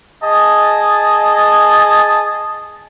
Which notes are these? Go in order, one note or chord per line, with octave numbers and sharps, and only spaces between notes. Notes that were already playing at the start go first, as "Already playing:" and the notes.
G#4 D#5 A5